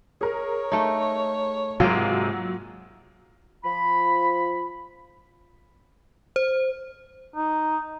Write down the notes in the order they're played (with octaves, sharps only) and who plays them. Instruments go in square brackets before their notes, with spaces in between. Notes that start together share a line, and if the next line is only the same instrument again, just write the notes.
[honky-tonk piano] G#4 A#4 [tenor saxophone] C#5
[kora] A3 D#4
[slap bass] G#2 C3 [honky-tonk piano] F#3 D7 [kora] A#3 F4
[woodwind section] F3 B5
[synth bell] C5
[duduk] D#4